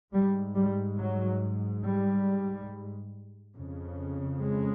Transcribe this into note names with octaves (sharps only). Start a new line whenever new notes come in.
G#2 G3
G3
F#3
G3
F2 C#3
G#3